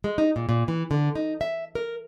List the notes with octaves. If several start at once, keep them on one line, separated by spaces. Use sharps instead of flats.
G#3
D#4
A#2
A#2
E3
D3
D#4
E5
A#4